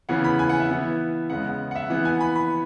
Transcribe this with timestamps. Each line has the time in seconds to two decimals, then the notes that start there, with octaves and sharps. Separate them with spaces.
0.09 C#3 E3 B3 F#5
0.24 B5
0.39 G#5
0.49 F#5
0.60 E5
0.70 E3 B3
1.29 C#3 G#3 B3 F#5
1.46 F#5
1.71 F#5
1.75 E5
1.90 E3 B3 F#5
2.05 G#5
2.21 B5
2.36 B5